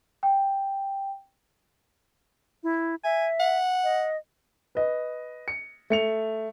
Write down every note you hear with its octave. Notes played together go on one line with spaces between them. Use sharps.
G5
E4
E5 G#5
F#5
D#5
B4 D#5
C#7
A3 C#7 F7